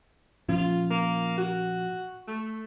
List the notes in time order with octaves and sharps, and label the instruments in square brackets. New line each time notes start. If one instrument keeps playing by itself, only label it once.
[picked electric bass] A#2 F3 C#4 [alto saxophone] F4
[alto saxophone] A#3
F#4
A3